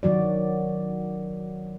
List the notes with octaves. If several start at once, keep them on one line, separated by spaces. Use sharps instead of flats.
D#3 F#3 F#4 D5